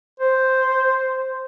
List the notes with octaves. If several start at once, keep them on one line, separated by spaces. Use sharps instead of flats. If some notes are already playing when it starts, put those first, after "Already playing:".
C5